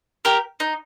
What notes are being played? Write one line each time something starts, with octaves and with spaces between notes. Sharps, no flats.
G4 A#4
D#4